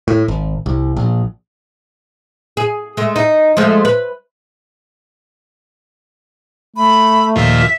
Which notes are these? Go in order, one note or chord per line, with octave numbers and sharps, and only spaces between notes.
A2
G#1
C2
A#1
G#4
G#3 A3
D#4
F3 G#3 A3
B4
A3 B5
D#2 A#2 F3 E5